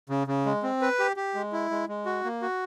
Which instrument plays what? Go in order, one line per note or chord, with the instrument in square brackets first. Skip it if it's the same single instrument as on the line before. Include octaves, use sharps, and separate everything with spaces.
[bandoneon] C#3
C#3
G#3
C4
B4
G4
G4
G#3
E4
G#3
G#3
F#4
A#3
F#4